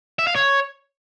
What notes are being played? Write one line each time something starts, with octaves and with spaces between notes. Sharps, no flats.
E5
F5
C#5